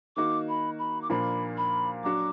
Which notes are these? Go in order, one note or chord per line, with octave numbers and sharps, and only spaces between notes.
D#3 A#3 D#4 F#4 D6
B5
B5
D6
A#2 F3 A#3 D4 F4 B5
B5
F#3 D4 F#4 D6